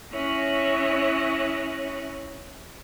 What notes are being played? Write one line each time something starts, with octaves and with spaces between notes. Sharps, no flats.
C#4 E4 C#5 D#6 F#6 A#6